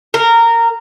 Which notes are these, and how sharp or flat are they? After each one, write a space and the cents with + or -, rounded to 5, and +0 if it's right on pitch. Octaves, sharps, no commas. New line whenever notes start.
A#4 -15